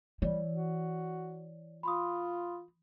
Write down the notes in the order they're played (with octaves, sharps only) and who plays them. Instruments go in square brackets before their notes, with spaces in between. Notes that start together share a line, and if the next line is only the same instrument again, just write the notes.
[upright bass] E3 [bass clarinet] G3 [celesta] C#5 D5
[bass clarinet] F#4
[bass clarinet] F4 [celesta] B5 C6 D#6